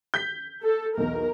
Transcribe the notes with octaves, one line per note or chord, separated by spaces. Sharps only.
G6 B6
A4
B1 E2 A#4